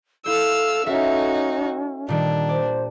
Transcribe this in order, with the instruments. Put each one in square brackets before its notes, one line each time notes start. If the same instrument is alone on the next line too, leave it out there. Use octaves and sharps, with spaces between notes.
[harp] E4 C5 [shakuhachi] A4 [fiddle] F5 E6
[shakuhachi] C#4 [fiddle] D#4 F#4 [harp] A4 E5 F5
[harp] A#2 D#3 G3 [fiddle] D4
[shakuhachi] C5 [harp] D5